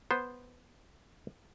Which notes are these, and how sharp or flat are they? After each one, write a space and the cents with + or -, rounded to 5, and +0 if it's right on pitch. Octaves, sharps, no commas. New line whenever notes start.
B3 +0 C5 +0